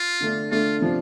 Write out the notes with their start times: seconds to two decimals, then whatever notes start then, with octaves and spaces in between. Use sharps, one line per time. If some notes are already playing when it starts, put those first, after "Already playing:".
Already playing: F4
0.20 D3 A3 D4
0.51 D3 A3 D4 F4
0.80 C3 F3 D4